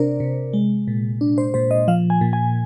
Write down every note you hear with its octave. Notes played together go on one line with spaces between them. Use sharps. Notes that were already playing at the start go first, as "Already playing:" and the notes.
Already playing: C3 D4 A#4 C5 D5
C3
G#3
A#2
D4
C5
A#2 C5
D#5
F3 F5
G#5
A#2
G#5